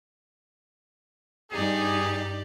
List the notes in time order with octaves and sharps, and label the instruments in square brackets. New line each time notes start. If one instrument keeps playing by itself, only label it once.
[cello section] G2 D#4 [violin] G4 D5 [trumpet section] G#4